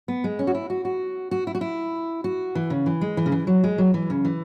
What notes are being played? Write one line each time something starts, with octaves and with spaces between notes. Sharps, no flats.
B3
G#3
C#4
F#4
E4
F#4
F#4
F#4
E4
F#4
E4
F#4
E3
C#3
E3
G#3
E3
C#3
E3
F#3
G#3
F#3
E3
C#3
E3